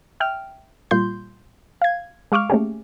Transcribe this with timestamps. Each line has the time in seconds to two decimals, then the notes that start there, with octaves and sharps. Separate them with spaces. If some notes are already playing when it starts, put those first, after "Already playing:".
0.20 E5 G5 F6
0.91 A#2 G3 F4 C6 G6
1.82 F5 G#6
2.32 G#3 F5 C#6 D6 F6
2.50 A3 A#3 C#4 G4 G#4